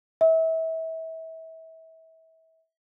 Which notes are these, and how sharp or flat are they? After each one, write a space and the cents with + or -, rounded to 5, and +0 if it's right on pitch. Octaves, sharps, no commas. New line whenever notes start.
E5 -30